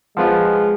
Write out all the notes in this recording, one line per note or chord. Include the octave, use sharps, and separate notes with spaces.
F3 G#3 B3 F4